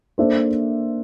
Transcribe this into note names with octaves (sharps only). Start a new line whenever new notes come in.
A#3 D4 A4 C5 E5